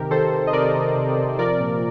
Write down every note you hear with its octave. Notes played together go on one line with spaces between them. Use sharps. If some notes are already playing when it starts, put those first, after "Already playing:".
Already playing: C3 D#3 G4 A#4
D#3 A4 C5
C3
D#5
C3 A#4 D5
C3
C3
C3
F3 A#4 D5
A#2